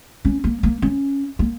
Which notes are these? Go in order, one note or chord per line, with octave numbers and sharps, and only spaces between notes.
C#4
A#3
A#3
C#4
A#3